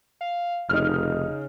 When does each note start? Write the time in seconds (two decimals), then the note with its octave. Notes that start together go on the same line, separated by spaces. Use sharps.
0.21 F5
0.69 F1 C#3 D#4 F6